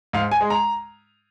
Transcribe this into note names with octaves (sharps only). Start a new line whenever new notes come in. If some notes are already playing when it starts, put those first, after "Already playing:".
G#2 F5
G#5
G#3
A#5